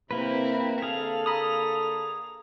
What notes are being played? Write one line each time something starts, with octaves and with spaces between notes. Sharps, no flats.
C3 A#3 C4 E4 B4
D3 A#3 G#4 A4 F5 F7
A#5 B5 D#6